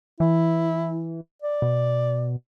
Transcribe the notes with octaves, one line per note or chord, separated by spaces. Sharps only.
E3 E4
D5
B2